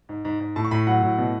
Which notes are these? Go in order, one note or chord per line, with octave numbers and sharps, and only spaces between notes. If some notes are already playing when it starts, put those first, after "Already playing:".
G#2
G#2
G#2
A2 A5
C#6
A2 B5
F#3 F#5
A2
B2